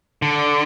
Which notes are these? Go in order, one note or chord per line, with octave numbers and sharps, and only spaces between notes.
D3